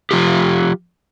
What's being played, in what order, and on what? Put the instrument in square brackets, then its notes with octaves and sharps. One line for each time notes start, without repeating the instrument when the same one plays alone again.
[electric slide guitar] F3 F4 G4